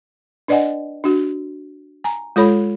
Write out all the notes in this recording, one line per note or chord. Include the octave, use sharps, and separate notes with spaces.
D4 B4 D5 D#5 F#5 G#5
D4 F#4
G#5 A#5
G#3 F4 A4 C#5 B5